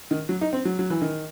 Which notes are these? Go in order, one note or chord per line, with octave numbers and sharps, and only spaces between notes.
D#3
F#3
D#4
C4
F#3
F#3
E3
D#3